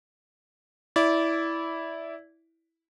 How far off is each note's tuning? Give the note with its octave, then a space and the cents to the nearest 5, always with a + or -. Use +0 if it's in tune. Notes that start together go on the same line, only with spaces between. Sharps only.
E4 -5 D5 -20